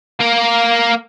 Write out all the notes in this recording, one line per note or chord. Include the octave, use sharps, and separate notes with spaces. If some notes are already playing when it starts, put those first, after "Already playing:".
A#3 A#4